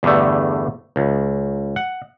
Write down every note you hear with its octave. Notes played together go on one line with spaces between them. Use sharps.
E2 G2 D3 A3
C#2
F#5